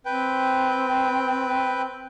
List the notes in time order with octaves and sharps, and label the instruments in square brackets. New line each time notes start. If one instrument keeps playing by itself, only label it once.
[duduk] C4 [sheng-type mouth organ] B4 G5